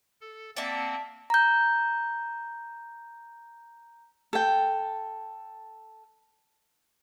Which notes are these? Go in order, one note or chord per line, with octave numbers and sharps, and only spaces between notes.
A4
A#3 C4 D5 E5 F#5 A5
A#5 G6
A4 G5